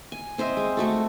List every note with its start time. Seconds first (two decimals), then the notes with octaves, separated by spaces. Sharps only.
0.12 G#5
0.38 C4 C5 D#5 E5
0.57 G#3
0.77 A3 F#4 A4